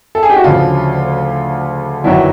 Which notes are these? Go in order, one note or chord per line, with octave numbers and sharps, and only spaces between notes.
A4
G#4
G4
F#4
D2 C#3 F3 F4
G1 F#2 D#3 F#3 E4